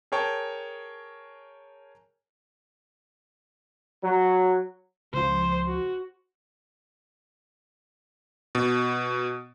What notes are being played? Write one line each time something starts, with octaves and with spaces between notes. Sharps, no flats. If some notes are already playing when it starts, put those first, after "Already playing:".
G#4 A#4 C#5 G5 A5
F#3
C#2 F3 C5
F#4
B2